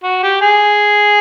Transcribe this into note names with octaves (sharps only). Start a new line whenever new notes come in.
F#4
G4
G#4